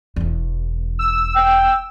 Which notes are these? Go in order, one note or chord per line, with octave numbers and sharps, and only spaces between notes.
E1 E2
E6
G5